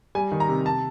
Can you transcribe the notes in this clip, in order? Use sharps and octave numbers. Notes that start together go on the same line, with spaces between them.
G3 G#5
D#3
A#5
C3
A5